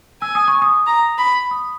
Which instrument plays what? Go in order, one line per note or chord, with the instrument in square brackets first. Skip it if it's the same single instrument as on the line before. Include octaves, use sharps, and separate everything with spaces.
[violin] G#5 [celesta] E6
[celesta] D#6
C#6
D#6
[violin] A#5
B5
[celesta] D#6